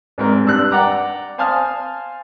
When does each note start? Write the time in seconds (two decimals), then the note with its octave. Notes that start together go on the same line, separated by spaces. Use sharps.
0.18 G#2 C4 A#4
0.44 G2 D4 E6 F#6
0.71 D5 F#5 G5 A#5 D6
1.38 C5 F5 G#5 A5 D#6 F6